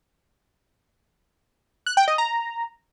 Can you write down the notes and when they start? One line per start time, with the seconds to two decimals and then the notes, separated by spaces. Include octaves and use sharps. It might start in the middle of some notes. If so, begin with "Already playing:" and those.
1.86 F#6
1.97 G5
2.08 D#5
2.18 A#5